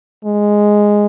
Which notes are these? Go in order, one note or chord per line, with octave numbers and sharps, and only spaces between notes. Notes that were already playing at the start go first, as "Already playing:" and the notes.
G#3